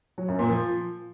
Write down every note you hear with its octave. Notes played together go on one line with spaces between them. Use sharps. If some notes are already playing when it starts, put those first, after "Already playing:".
F#3
F#2
A#2
F3